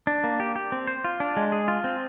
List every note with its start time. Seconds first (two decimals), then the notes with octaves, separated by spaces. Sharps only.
0.07 D4
0.24 A#3
0.40 G4
0.56 G4
0.72 C4
0.87 C5
1.04 F4
1.20 D4
1.37 G#3
1.52 G#4
1.68 F4
1.84 C4